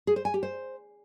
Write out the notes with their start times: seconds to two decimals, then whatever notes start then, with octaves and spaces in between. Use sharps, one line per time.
0.07 G#4
0.16 C5
0.25 G#5
0.34 G4
0.43 C5